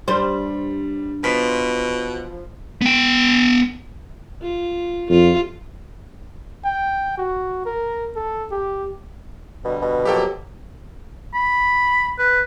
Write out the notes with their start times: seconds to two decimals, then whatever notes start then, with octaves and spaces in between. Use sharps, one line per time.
0.08 G2 G3 C5
1.24 B2 F3 B6
2.81 B3 G5
4.42 F4
5.10 F2 F4
6.65 G5
7.18 F#4
7.66 A#4
8.16 A4
8.51 G4
9.64 B2 D3 G3
9.82 B2
10.05 F3 F#3 A#3 G4 A4 G5
11.34 B5
12.19 B4